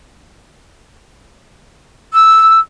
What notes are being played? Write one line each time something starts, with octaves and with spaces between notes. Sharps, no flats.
E6